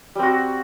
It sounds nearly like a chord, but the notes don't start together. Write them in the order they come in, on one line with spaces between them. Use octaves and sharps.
G3 C4 F#4